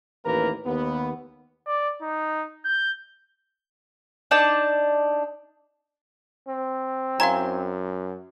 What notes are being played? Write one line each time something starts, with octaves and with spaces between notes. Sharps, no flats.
A1 D#2 A#3 A#4 B4 A#5
D#2 B3
D5
D#4
G6
D4 D#4 D5 A5
C4
F#2 E4 F5 G#5 A#5 C6